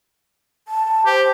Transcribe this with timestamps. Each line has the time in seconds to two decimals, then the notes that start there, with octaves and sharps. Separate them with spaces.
0.68 A5
1.06 G4 C5